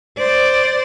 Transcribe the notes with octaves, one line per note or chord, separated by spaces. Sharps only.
C5 D5